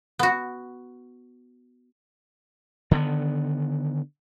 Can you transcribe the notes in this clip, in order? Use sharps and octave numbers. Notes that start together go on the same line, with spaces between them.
B3 F#4
D3 D#3 G#3 B3